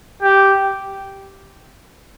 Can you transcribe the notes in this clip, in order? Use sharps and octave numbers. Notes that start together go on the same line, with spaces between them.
G4